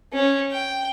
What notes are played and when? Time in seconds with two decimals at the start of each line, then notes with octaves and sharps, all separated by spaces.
0.12 C#4
0.52 G5